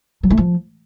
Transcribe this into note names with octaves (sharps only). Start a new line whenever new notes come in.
F#3
A3
F3